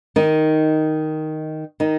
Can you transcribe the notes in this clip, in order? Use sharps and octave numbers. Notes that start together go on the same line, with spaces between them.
D#3 D#4
D#3 D#4